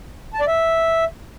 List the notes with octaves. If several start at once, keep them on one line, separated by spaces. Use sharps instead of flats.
A5
D5
E5